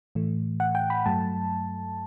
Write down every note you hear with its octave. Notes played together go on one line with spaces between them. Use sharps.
A2 E3 A3
F#5
G5
B5
G2 F#3 A3 A5